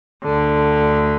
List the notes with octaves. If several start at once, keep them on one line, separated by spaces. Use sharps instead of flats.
D2 D3